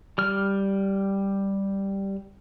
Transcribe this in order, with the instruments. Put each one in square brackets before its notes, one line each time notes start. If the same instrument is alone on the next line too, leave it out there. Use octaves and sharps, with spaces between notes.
[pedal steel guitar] G3 F6